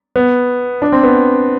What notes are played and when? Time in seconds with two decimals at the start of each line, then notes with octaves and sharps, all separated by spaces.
0.16 B3
0.82 D4
0.92 C4
1.03 B3